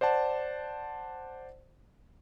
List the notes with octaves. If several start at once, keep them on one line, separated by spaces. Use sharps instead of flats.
C5 D5 F#5 A5